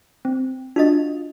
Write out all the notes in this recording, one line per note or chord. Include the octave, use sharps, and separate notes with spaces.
C4
D4 F4 F#4 D#5 A6